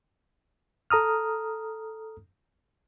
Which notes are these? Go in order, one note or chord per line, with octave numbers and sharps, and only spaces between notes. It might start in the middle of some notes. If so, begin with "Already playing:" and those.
A4 A#5 D#6 F6